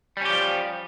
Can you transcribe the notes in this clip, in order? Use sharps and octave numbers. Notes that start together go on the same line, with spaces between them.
F3 G3 C#4 G4